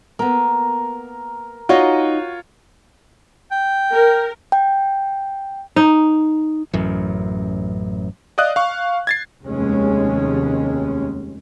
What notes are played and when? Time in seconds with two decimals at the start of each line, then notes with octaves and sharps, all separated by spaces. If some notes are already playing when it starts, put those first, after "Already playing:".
0.19 A#3 B3 A#4
1.69 D#4 F4 F#4 C#5 D#5 F#5
3.52 G5
3.92 A#4
4.52 G5
5.76 D#4
6.73 A1 F#2
8.38 D5 D#5 F5 D#6 F#6
8.56 F5 C#6
9.07 G#6 A6 C7
9.45 F1 D#2 G#3 C#4